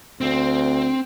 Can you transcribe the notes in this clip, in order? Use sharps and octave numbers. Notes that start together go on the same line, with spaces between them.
D2 C4